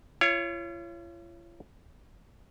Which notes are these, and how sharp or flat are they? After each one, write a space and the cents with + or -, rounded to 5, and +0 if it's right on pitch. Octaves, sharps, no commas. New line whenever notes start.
F4 -45 C#5 +0